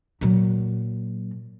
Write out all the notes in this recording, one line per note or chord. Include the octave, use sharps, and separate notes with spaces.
A#2 F#3